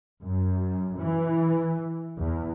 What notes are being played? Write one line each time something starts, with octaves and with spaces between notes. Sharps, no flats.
F#2
E3
E2